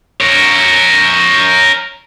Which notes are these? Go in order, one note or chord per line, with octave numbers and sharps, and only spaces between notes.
A#4 C#5